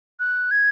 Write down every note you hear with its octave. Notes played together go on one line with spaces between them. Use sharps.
F#6
G#6